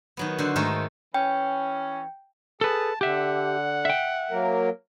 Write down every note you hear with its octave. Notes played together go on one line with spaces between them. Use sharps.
D#3 F#3 B3
D3 F#4 C5
G#2 D#3 A3 A#4
E3 C#4 G5
G#4 A4 B4 A5
D3 G4 E5 F#5
E5 G5
F#3 A#3 A#4